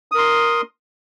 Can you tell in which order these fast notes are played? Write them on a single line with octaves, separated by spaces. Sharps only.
D#6 A#4 C6